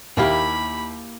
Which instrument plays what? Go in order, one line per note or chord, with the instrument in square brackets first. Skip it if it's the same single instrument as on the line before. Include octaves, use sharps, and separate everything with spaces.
[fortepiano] D#2 F5 [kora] A#3 E4 G4 [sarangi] B5